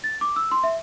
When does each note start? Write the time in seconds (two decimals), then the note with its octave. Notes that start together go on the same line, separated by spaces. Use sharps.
0.04 A6
0.21 D6
0.36 E6
0.52 C6
0.64 E5